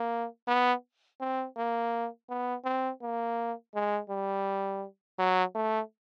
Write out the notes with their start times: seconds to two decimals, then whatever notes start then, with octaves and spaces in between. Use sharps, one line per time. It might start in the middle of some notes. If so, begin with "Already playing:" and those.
Already playing: A#3
0.48 B3
1.21 C4
1.57 A#3
2.29 B3
2.65 C4
3.02 A#3
3.75 G#3
4.10 G3
5.19 F#3
5.55 A3